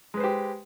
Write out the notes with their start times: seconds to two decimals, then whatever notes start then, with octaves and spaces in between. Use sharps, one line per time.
0.14 G#3
0.17 B4
0.20 C5
0.24 G4